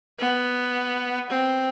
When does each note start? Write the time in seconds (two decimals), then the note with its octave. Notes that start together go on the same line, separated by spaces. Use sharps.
0.19 B3
1.30 C4